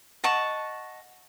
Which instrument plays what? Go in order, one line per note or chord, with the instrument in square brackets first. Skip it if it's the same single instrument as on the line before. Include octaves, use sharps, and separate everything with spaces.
[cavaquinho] D#5 F#5 A5 C#6